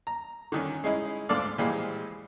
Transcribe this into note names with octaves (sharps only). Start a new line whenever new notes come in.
A#5
D3 D#3 C#4
G#3 C#4 D#4 E4
D2 G#2 D4 A4 D5 F5
A#2 E3 F3 G3 G#3